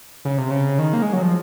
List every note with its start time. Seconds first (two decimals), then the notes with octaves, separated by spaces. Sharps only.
0.25 C#3
0.38 C3
0.51 C#3
0.79 D#3
0.93 A#3
1.02 G#3
1.13 F#3
1.22 F3